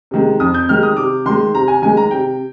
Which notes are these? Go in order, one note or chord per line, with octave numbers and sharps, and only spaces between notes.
C3 D#3 G#3
F2 D#6
G6
C3 D#3 G#3 F6
D#6
C3 D6
D#3 G#3 C6
C3 A#5
G#5
D#3 G#3 G#5
A#5
C3 G5